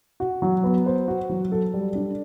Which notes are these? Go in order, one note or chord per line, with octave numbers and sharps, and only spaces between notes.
F#4
F#3
B3
C5
F#4
F#3
A4
G3
D4